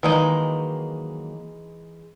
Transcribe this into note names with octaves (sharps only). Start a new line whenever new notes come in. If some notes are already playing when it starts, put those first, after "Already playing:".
D#3 E3 F#3 G#3 A#3 D#4